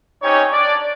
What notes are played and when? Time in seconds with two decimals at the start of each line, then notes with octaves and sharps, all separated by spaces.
0.22 C4 C#4 D#4 G4 C#5
0.52 D4 D5